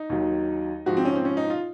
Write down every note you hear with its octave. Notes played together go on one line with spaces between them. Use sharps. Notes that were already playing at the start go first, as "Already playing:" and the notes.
Already playing: D#4
D#2 D#3 F#3
G#2 F3 F#4
C4
C#4
C4
C#4
D#4
F4